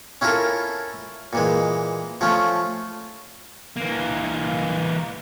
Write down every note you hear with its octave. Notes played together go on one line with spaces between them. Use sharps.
C#4 E4 F4 A4 A#4
A#2 E3 G#3
F3 A3 C#4 F4
E3 A#3